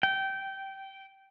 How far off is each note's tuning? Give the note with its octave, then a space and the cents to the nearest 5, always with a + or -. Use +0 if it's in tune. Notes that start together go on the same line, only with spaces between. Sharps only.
G5 -15